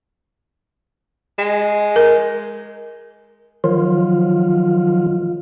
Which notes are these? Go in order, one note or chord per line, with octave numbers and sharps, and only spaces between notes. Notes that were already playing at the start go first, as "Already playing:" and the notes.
G#3
A#4
D#3 F3 F#3 F4